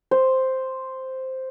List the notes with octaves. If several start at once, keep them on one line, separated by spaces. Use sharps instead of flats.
C5